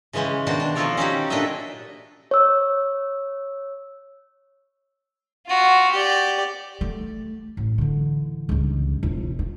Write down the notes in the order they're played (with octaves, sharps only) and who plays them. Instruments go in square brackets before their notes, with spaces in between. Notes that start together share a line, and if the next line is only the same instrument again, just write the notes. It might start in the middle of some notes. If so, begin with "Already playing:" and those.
[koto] C#3 E3 G#3 C#4 C5
B2 D#3 D4 F#4 C5 A5
D4
F3 D#4 F4 A4 C#5 D5
C#4 D#4 F#4 G4
A#2 D4 A4 B4 D#5 E5
[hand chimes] C#5 E6
[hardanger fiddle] F4 F#4
G4 D5
[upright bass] A3
A1
D3 E3
C#2 G2
E1 F4
F4